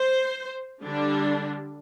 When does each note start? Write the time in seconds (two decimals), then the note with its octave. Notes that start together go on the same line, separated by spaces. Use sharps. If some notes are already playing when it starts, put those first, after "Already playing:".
Already playing: C5
0.84 D3 G3 D4